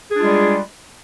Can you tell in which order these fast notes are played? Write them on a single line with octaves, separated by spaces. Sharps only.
G#4 D4 F4 G#3 G3